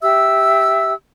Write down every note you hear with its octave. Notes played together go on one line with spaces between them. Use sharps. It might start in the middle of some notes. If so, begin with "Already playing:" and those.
G4 E5 E6